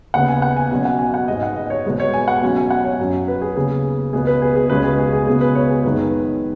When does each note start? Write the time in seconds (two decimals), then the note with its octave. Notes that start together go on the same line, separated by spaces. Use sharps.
0.14 D#2 C#3 B3 F#5
0.28 G#5
0.42 F#5
0.57 G#5
0.71 B2 F#3 C#4 G#5
0.85 F#5
0.99 G#5
1.14 F#5
1.28 G#2 G#3 B3 D#5
1.43 F#5
1.56 D#5
1.70 C#5
1.85 B2 G#3 B3
2.00 C#5
2.14 G#5
2.28 F#5
2.42 B2 F#3 C#4
2.57 G#5
2.70 F#5
2.84 C#5
2.99 F#2 F#3 C#4
3.28 B4
3.41 G#4
3.56 D#2 C#3 B3 G#4
4.13 C#2 B2 B3 G#4
4.27 B4
4.42 G#4
4.56 G#4
4.70 C#2 B2 G#3 C#4 B4
4.84 G#4
4.98 G#4
5.13 G#4
5.27 C#2 B2 B3 G#4
5.41 B4
5.55 C#5
5.70 G#4
5.84 F#2 D#3 G#3 B3 B4